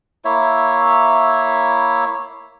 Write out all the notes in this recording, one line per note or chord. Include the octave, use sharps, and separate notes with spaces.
A#3 E4 C#5 E5